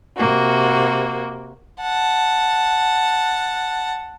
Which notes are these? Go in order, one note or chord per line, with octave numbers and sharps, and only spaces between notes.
C3 A#3 F#4
F#5 A5